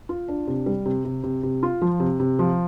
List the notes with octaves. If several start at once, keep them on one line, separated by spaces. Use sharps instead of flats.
F4
D4
C3
G3
C3
C3
C3
C3
F4
F3
C3
C3
F3